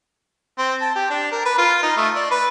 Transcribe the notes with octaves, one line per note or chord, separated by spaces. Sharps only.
C4
A5
G4
D4
A#4
B4
F4
D#4
A3
D5
B4